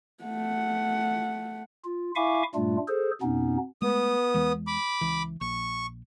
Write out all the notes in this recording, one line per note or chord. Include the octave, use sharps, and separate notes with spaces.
A3 F#5
F4
E4 E5 F5 G#5 C#6 D6
G2 A#2 G3 A3 D4 F4
G#4 A4 C5
F2 B2 B3 C#4 D#4
G#3 A3 B3 D#6
E2 E3 G#3
B5 D6
C#2 E3
A#1 C#6